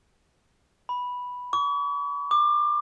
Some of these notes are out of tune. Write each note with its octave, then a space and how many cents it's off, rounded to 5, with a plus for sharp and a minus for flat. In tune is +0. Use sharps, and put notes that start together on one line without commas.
B5 -5
C#6 +45
D6 +30